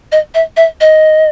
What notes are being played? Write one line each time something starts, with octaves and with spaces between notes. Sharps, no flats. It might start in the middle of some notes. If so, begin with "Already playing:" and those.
D#5
E5
E5
D#5